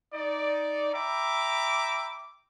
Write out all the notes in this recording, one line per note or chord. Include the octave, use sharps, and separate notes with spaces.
D#4 D5
E5 G5 A#5 B5 D6